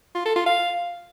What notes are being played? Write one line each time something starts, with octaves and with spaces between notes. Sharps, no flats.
F4
A4
F4
F5